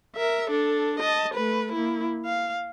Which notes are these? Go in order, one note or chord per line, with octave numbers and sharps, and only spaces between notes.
A#4 E5
D4 A4
D#5 A5
A3 B4
A#3 E4
F5